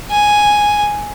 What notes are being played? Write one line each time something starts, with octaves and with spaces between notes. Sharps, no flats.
G#5